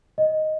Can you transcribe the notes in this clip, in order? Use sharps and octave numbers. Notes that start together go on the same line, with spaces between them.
D#5